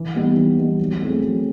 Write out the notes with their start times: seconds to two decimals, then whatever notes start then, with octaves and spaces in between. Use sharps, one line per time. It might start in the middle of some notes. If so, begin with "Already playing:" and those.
Already playing: E3
0.15 G3 B3 D#4
0.37 E3
0.59 G3 B3 D#4
0.80 F#3
1.01 A3 C4 E4 G#4
1.23 F#3